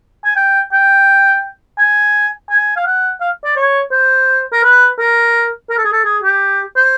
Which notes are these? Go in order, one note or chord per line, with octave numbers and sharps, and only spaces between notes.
G#5
G5
G5
G#5
G#5
F5
F#5
F5
D5
C#5
C5
A#4
B4
A#4
A#4
A4
G#4
A4
G#4
G4
C5